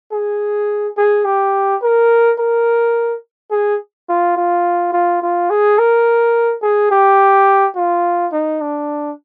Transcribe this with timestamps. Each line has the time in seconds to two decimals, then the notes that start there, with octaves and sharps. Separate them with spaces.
0.12 G#4
0.97 G#4
1.25 G4
1.82 A#4
2.39 A#4
3.51 G#4
4.09 F4
4.36 F4
4.92 F4
5.22 F4
5.50 G#4
5.78 A#4
6.62 G#4
6.91 G4
7.76 F4
8.32 D#4
8.61 D4